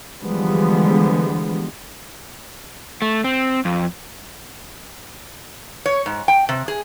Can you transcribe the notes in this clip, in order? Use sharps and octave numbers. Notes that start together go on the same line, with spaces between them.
D3 E3 F3 G3 G#3 B3
A3
C4
F2
C#5
G#2
G5
C3
G#4